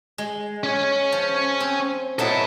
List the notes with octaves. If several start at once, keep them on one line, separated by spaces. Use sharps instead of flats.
G#3
C#4 C#5
F3
C4
B2 F#3 E4 A4 A5